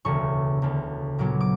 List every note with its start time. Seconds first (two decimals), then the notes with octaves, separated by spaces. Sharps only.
0.05 E1 D2 C#3 C#6
0.62 E1 D2 C#3
1.18 A#1 A#2 F#3 B3 D6
1.40 D6